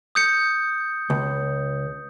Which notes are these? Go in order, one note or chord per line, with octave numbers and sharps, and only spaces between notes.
D#6 G6 C#7
C#2